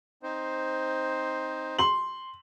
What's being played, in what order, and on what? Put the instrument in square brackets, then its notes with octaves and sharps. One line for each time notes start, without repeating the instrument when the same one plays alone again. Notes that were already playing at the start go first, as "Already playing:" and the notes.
[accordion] C4 D#4 C5
[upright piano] C6 F#7